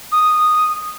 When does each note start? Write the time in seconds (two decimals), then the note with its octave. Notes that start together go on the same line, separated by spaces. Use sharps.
0.12 D#6